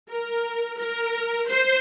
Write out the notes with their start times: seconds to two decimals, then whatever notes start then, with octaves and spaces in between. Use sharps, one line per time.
0.11 A#4
0.80 A#4
1.49 C5